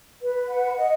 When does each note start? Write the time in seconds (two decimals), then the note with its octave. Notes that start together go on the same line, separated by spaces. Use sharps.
0.21 B4
0.48 F#5
0.77 D#5